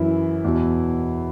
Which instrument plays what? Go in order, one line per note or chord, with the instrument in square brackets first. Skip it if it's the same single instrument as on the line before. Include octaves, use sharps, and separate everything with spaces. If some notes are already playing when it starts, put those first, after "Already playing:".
Already playing: [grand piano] F#2 E3 E4
E2 B2